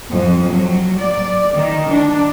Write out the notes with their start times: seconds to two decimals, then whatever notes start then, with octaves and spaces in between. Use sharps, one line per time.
0.11 F2
0.51 F#3
0.99 D5
1.56 D#3
1.90 D4